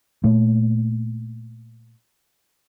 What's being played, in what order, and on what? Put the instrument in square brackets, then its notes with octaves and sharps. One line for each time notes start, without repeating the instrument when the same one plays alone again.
[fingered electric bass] A#2 A3